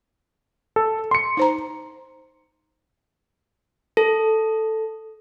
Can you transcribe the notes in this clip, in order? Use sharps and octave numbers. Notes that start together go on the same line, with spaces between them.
A4
C6 C#7
D#4 C5 A#5
A4